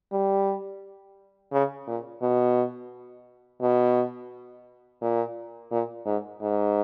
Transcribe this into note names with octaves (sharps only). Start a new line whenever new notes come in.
G3
C#3
A#2
B2
B2
A#2
A#2
G#2
G#2